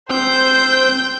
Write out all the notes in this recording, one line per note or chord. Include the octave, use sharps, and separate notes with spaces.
C4 C5 G5 G6